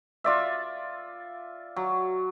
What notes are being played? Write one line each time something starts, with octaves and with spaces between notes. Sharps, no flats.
F4 D5 E5
F#3